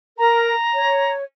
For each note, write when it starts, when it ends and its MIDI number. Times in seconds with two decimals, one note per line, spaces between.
0.18 0.53 70
0.18 1.13 82
0.73 1.22 73